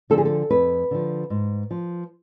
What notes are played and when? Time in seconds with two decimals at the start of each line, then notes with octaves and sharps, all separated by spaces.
0.10 D3 F3 A4
0.18 G#4
0.25 A4
0.50 F2 B4
0.91 D3 F3
1.30 G#2
1.71 F3